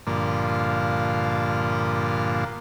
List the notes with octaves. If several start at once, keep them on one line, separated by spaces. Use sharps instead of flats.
G2 A#2 D3 F3 A#3